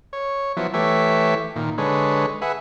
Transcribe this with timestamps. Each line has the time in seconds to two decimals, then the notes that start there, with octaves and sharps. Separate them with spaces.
0.13 C#5
0.57 F3 F#3 B3 E4
0.74 E3 A3 G4 B4 C#5 E5
1.56 A#2 D#3
1.78 D3 G#3 B4 C#5
2.42 G#4 B4 E5 F#5